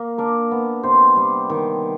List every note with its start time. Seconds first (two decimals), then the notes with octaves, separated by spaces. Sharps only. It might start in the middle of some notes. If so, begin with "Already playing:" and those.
Already playing: A#3
0.18 D4 A#4
0.51 B3
0.83 C3 C5
1.16 G3
1.50 D#3